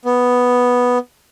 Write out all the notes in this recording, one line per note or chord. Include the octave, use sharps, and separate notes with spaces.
B3